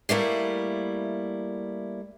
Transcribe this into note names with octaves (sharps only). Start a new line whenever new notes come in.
G3 A3 A#3 E4